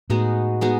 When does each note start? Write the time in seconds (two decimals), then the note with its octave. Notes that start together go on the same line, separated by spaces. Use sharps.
0.10 A2 G#3 B3 D#4 F#4
0.61 G#3 B3 D#4 F#4